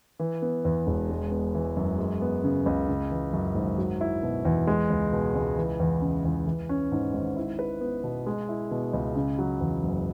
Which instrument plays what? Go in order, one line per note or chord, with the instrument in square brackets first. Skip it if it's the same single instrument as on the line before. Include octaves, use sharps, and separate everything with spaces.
[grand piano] E3
B3
E2
E1
G#3
B3
E3
F#2
G#3
B3
C#3
C#2
C#3
E3
F#2
G#1
F#3
E4
B2
E2
G#3
C#2
B2
C#2
E3
E2
C#3
E2
E3
C#4
G#2
G#1
E4
B4
B3
B2
G#3
E4
B2
C#2
C#3
F#3
E2
F#1